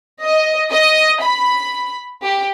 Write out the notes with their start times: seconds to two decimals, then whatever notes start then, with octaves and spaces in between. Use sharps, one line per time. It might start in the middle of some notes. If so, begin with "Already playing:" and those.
0.23 D#5
0.71 D#5
1.22 B5
2.23 G4